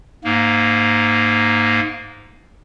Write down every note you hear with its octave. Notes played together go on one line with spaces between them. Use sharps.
G#2 A#3